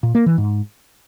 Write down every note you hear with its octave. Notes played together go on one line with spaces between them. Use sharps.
A#2
A#3
E3
G#2